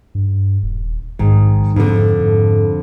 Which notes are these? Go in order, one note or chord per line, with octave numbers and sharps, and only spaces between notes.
G2
D#1
A#1 G#2 D#3
F2 G#2 D3
G#2